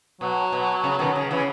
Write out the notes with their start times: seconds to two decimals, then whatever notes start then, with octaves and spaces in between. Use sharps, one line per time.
0.21 B2 F#3
0.52 B2
0.84 C#3
0.99 B2 D#3
1.15 C#3
1.31 C#3 E3